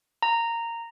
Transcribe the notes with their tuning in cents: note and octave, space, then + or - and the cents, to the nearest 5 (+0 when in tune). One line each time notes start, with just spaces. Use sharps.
A#5 -10